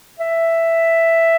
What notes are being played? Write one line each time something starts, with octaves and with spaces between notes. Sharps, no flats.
E5